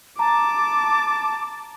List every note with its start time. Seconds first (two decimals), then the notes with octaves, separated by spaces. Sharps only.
0.19 A5 A#5 D6